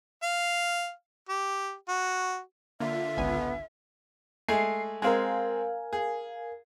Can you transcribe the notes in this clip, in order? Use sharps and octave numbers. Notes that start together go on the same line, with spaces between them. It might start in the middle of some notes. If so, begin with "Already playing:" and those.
F5
G4
F#4
D3 A#3 F4 E5
G#1 C#2 B3 G#5
G#3 A3 G#5 C7
G#3 C4 A#4 F5 G#5
G#4